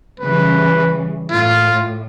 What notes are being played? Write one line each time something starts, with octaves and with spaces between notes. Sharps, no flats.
C#3 E3 G3 B4
A2 F4